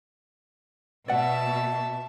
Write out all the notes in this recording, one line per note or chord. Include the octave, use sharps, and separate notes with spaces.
B2 D5 E5 F#5 A5